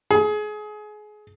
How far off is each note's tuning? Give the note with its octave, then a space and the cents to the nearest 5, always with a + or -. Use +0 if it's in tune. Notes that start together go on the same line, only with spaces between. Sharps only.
G#4 +25